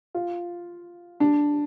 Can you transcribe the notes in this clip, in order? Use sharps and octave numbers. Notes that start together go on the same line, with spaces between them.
F4
D4